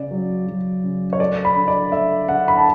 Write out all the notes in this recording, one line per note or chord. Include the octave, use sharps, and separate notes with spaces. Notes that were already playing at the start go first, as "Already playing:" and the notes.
Already playing: C#3 D5
F#3
F#3
C#3
C#5
A3 D5
B5
D3
D5
A3 E5
D3 F#5
B5
A5